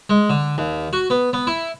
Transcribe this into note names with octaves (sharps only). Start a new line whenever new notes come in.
G#3
D3
D#2
F#4
B3
B3
E4